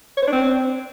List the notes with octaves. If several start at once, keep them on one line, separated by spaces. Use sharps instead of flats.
C#5
C5
D4
C4